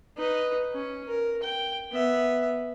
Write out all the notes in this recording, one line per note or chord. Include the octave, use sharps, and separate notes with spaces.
D#4 B4
C#4
A#4
G5
B3 E5